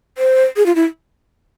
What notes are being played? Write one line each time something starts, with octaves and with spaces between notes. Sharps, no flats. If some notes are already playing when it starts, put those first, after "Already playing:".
C5
G#4
F4
E4